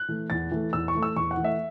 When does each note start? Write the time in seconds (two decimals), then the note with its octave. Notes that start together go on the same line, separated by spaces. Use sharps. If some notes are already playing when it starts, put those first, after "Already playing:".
Already playing: F#6
0.09 E3 A3
0.30 E2 A6
0.51 E3 A3
0.73 E2 E6
0.88 C#6
0.95 E3 A3
1.03 E6
1.16 E2 C#6
1.31 F#5
1.37 E3
1.42 A3 E5